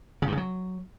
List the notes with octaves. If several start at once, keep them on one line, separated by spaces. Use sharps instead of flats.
C#3
G2
C#3
F#3